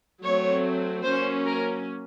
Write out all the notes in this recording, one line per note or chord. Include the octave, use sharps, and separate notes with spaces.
F#3 A3 C4 C#5
F#3 A#3 C#4 C5
A#4